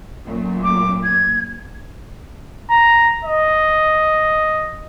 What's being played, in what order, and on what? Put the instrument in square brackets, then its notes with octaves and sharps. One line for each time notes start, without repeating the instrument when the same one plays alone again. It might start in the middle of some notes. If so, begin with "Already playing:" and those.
[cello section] F#2 A#2 A3
[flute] D6
G#6
[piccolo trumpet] A#5
D#5